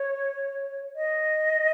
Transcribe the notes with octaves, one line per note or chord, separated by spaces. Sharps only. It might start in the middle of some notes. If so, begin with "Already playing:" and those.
Already playing: C#5
D#5